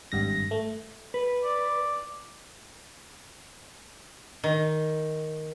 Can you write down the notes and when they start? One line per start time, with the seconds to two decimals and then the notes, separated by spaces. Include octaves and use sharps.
0.12 G#1 G2 A#6
0.51 A3
1.14 B4
1.43 D5
4.44 D#3